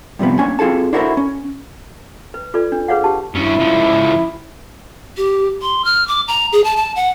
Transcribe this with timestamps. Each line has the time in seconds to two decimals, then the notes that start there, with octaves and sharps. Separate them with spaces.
0.19 G2 C3 F3 B3
0.39 A#3 C#4 D4 G#5
0.59 C4 F4 G#4 A4 A5
0.93 D4 E4 F#4 A4 A#4 C5
1.17 C#4
2.34 B4
2.54 F4 A4 B4 D5
2.72 D4
2.88 G#4 B4 C#5 F5 F#5
3.04 G4 A5
3.35 G2 C#4 E4
3.59 C#2 F3
5.17 G4
5.62 C6
5.85 F6
6.08 D6
6.28 A#5
6.53 G#4
6.64 A5
6.77 A5
6.96 F#5